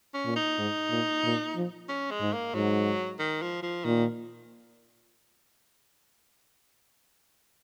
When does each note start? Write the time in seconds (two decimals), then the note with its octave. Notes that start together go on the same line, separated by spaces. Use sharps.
0.14 C#4
0.25 A#2
0.36 D#4
0.58 G#2
0.90 A#2
1.24 A#2
1.56 F3
1.89 C#4
2.11 G#3
2.21 G#2
2.33 A#3
2.54 G#2 F#3
3.19 D#3
3.42 F3
3.63 F3
3.85 A#2 D#3